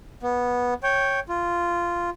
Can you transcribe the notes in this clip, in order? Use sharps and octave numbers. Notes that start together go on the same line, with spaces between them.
B3
C#5 G5
F4